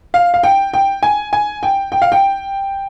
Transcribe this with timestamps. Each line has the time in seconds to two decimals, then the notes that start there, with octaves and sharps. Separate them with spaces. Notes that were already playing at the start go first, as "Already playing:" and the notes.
0.14 F5
0.34 F5
0.43 G5
0.73 G5
1.03 G#5
1.33 G#5
1.63 G5
1.92 G5
2.02 F5
2.12 G5